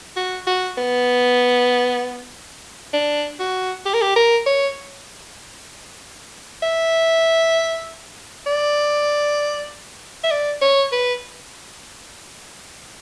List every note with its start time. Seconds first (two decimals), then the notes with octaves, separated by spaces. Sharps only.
0.16 F#4
0.47 F#4
0.78 B3
2.93 D4
3.40 F#4
3.86 G4
3.94 A#4
4.02 G4
4.16 A#4
4.46 C#5
6.63 E5
8.46 D5
10.24 E5
10.31 D5
10.61 C#5
10.92 B4